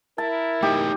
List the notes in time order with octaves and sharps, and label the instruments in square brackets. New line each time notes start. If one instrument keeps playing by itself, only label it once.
[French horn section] E4 A#4 [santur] A5
[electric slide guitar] A3 D#4 F#4 [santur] G4